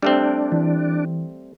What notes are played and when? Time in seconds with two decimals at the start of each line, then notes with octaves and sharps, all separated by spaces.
0.03 G3 A3 C4 D4
0.52 E3